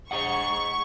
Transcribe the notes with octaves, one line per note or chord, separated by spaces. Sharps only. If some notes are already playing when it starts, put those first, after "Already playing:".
G#4 D#5 F#5 C#6